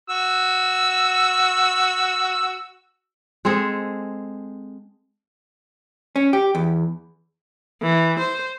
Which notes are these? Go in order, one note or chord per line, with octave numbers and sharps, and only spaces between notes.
F#4 E6
G#3 C4 G#4 A4
C#4
G4
E2
E3
C5